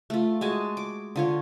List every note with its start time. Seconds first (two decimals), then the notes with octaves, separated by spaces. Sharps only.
0.10 A3 F4
0.41 G#3 F#4 G#5 A5
0.77 D6
1.16 D3 F4 C#5